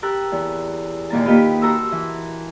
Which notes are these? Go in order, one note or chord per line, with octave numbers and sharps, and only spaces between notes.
G4 A#4 A5 E6 F#6
E2
D#2 A#2 A#3 A#4 A5
A#3 D#4 F4 G4 B4
F#4 A4 A#4 A#5 C6 E6
E3